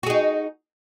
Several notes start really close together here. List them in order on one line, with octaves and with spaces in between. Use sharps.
F#4 G#4 D#4